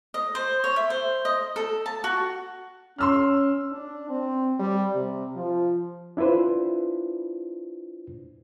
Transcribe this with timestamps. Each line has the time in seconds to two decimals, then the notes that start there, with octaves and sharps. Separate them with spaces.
0.14 D#5
0.35 C5
0.64 C#5
0.76 E5
0.90 C5
1.25 D#5
1.56 A4
1.86 A5
2.04 F#4
2.98 C#4 C6 E6 F6
3.72 D4
4.09 C4
4.59 G3
4.95 C3
5.35 F3
6.17 D4 E4 F4 B4 C5